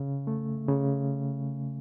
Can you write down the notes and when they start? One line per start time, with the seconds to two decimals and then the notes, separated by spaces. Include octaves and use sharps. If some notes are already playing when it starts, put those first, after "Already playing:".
Already playing: C#3
0.27 A3
0.68 C#3